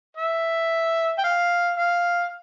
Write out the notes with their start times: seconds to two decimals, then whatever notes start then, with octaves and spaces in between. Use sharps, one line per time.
0.17 E5
1.18 G5
1.24 F5
1.77 F5